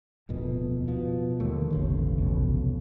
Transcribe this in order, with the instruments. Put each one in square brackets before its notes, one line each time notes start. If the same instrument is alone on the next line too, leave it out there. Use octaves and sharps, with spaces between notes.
[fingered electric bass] D1 F2 B2
B2 F3
[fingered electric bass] D#2 [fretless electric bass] D3 A3
[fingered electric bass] E1 A1 C#3
[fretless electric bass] C2 F2 B2